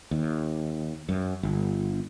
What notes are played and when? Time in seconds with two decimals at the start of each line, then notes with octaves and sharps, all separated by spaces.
0.11 D#2
1.09 F#2
1.43 G1